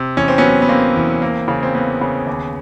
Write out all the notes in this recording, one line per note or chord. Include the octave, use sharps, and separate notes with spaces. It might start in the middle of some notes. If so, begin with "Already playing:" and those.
Already playing: C3
E2 C#4
C4
F#3 B3 C#4
B3
A#3 C4
E2
A#3
C#3
C4
A#3 B3
C#3
D#2